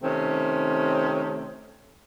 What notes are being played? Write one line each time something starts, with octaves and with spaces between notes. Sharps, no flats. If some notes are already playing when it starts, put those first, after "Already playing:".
C3 D#3 A3 C4 C#4